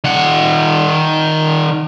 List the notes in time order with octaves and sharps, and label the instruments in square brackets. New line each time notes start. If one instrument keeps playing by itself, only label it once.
[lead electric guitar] D#3 F#5